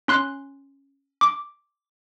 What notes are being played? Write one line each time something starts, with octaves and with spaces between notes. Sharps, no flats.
C#4 C6 F#6
D6